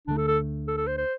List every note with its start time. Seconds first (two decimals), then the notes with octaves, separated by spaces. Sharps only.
0.07 D2 D3 F3 A3 D4
0.17 A4
0.28 A4
0.67 A4
0.77 A4
0.87 C5
0.98 C5